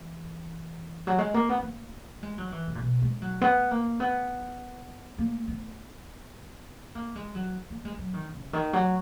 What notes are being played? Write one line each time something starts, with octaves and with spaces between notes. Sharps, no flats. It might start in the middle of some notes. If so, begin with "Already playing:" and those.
Already playing: E3
F#3
G#3
A#3
B3
A#3
G#3
F#3
E3
C#3
A#2
B2
G#3
F#3
B3
A#3
B3
A#3
B3
A#3
G#3
F#3
A#3
G#3
F#3
D#3
C#3
D#3
F#3